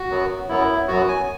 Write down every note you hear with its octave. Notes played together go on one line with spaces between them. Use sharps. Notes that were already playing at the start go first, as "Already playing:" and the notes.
Already playing: F#4
F#2 F#3 B3
F#2 F#3 B3 E4
F#2 F#3 B3 F#4
G#5